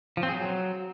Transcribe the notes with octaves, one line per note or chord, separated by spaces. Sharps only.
F3
C4
G#4
F#3